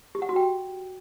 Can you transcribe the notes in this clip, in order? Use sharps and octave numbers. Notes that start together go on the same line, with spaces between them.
G4
F#5
F#4
G5